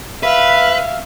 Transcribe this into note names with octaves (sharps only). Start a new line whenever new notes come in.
B4 E5 F5